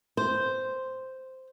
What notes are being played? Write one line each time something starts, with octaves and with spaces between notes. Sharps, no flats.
C5